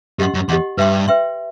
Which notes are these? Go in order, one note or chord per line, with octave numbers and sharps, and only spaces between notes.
F#2 G4 D#5 F#5 C6
F#2
E2 G4 D#5 F#5 C6
G2 B4 E5 G5 C6
B4 E5 G5 C6